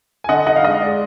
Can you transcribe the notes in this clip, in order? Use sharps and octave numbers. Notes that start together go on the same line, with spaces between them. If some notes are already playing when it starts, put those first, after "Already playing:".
G#5
D3 D#5 F#5
D#4 D#5 F#5
F5
G#3 D#5
G#3 D5